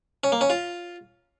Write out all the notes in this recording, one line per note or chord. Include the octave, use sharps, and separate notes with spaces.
C#4
A#3
C#4
F4